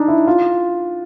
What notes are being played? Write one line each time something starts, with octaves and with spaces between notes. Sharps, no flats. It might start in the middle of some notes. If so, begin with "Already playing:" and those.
Already playing: D4 D#4
E4
F4